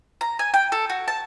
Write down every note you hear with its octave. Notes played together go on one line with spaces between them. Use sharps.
A#5
G#5
G5
A4
F#4
A5